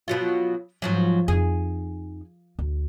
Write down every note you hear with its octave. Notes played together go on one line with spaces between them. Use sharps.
B2 F#3 F4
G#2 F3 F#3
F2 D#4 G#4
D2